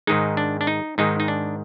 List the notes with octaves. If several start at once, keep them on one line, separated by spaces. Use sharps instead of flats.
G#2 D#3 G#3 D#4
D4
D4
D#4
G#2 D#3 G#3 D#4
D#4
D4